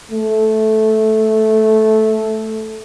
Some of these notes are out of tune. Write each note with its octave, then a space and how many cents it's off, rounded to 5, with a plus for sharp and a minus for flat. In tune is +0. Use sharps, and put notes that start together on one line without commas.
A3 -10